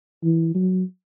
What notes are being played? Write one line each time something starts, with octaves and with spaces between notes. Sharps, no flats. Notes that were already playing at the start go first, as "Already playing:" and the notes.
E3
F#3